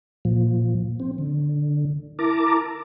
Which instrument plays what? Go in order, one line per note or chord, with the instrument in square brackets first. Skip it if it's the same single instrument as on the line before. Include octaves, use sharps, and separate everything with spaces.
[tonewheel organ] A#2 F3
C4
D3
E4 A#4 A5 A#5 D6